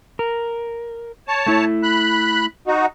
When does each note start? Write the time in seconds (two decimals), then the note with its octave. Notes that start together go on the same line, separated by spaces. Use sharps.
0.19 A#4
1.28 C#5 A5
1.47 A3 E4
1.83 B5 F#6
2.67 D#4 F#4